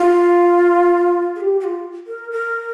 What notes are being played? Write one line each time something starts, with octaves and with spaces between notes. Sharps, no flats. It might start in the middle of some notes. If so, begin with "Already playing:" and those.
Already playing: F4
G#4
G4
G4
F4
A#4
A#4